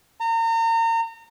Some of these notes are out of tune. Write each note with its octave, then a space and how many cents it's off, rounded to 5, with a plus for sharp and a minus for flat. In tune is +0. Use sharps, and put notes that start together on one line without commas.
A#5 -35